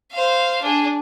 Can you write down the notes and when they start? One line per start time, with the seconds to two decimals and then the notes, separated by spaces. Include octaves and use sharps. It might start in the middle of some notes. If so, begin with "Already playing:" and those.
0.12 C5 F5
0.62 D4 G#4